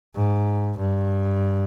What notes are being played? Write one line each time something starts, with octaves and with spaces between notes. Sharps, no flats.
G#2
G2